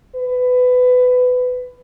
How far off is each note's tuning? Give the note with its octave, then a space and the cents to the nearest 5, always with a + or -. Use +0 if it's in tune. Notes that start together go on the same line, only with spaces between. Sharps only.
B4 +20